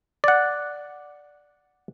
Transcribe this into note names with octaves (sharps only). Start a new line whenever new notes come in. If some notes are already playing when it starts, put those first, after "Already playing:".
D5 F#5